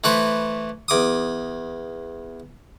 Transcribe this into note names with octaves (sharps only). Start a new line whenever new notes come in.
E3 A3 B4 C5
E2 D6 D#6